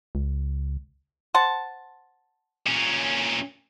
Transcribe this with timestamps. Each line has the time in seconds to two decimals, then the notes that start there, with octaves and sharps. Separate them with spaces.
0.15 C#2
1.34 C5 F#5 A5
2.67 A#2 C#4